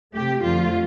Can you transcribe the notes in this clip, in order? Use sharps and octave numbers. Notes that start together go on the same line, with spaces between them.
C3 A3 G4
F2 D3 F3 A3 F4